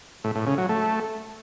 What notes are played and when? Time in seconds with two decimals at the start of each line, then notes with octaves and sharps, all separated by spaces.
0.24 A2
0.36 A2
0.47 C#3
0.58 F#3
0.69 A3